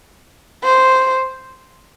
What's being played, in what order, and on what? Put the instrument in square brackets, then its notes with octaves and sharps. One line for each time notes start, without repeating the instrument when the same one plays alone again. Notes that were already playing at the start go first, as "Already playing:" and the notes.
[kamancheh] C5